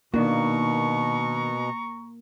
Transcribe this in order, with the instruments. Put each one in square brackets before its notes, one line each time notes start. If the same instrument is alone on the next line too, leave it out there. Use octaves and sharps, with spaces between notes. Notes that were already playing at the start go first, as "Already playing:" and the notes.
[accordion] B2 [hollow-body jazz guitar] D#3 D4 F#4 [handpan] A#3 [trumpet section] A#5 C#6